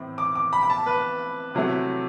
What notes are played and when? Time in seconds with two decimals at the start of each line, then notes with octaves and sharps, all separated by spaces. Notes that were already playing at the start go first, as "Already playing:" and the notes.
Already playing: A2 E3 C4
0.18 D6
0.35 D6
0.53 B5
0.63 B5
0.70 A5
0.86 B4
1.55 C3 F#3 A3 E4